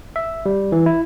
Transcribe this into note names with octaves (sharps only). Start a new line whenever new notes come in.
E5
G3
E3
E4